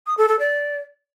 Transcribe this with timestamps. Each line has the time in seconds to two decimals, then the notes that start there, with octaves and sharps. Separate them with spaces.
0.07 D#6
0.18 A4
0.29 A4
0.39 D5